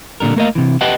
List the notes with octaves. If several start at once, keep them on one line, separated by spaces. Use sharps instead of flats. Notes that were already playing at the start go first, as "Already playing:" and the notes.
A#2 D3 G3 A#4
A3 A#3 A#4 B4 D#5 F5
C3 E3
G4 B4 D#5 F#5 G5 A5